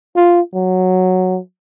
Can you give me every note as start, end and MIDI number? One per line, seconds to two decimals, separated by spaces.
0.16 0.41 65
0.54 1.38 54